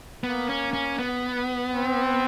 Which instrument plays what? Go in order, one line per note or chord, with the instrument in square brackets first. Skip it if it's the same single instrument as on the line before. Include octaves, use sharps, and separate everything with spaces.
[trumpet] A#3 [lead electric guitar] B3
[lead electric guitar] C#4
C#4
B3
[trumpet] C4